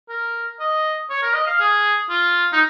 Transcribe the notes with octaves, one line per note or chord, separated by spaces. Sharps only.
A#4
D#5
C#5
A#4
D#5
F5
G#4
F4
D#4